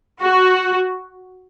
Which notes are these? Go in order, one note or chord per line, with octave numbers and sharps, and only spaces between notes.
F#4